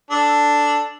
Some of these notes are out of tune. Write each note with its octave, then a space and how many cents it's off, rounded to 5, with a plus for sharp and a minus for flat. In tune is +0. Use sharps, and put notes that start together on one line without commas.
D4 +0 A4 +0